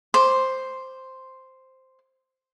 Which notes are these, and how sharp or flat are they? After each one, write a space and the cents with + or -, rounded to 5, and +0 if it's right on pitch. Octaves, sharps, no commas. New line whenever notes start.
C5 +0 D6 +0